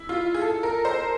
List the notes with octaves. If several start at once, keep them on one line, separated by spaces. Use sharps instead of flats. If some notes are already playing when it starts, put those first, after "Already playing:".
Already playing: E4
F4
G#4
A4
A#4
C5